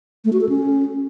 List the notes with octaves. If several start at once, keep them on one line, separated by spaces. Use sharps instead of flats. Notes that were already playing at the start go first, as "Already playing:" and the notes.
A3
F#4
A4
C#4